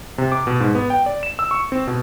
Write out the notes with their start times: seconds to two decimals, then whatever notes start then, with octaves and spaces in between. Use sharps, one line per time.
0.18 C3
0.32 D6
0.47 B2
0.60 G#2
0.75 B3
0.90 G5
1.06 D5
1.23 E7
1.39 E6
1.51 C#6
1.72 C4
1.87 B2